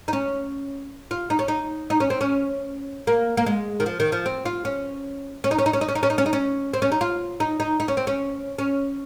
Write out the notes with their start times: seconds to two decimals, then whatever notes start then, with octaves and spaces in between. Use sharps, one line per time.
0.08 D#4
0.13 C#4
1.11 F4
1.30 D#4
1.39 C#4
1.48 D#4
1.90 D#4
2.00 C#4
2.10 C4
2.21 C#4
3.07 A#3
3.37 A#3
3.46 G#3
3.80 D#3
3.86 F3
4.00 D#3
4.12 F3
4.26 C4
4.45 F4
4.65 C#4
5.44 C#4
5.51 D#4
5.58 C#4
5.66 D#4
5.73 C#4
5.81 D#4
5.88 C#4
5.95 D#4
6.03 C#4
6.10 D#4
6.18 C#4
6.26 D#4
6.33 C#4
6.73 C4
6.82 C#4
6.92 D#4
7.01 F4
7.40 D#4
7.60 D#4
7.80 D#4
7.88 C#4
7.97 C4
8.07 C#4
8.59 C#4